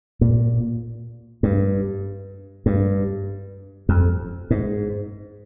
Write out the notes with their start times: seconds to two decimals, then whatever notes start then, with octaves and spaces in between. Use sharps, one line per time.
0.21 A#2
1.43 G2
2.66 G2
3.89 F2
4.51 G#2